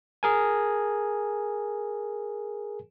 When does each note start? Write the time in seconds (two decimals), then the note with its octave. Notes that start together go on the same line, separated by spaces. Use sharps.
0.23 G#4 A#4 G#5